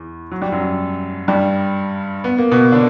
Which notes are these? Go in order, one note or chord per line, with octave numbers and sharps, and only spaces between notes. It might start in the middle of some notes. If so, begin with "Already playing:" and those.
Already playing: E2
F#3
G3
F#2 F#3
G2 G3
B3
A#3
B2 B3
D3 D4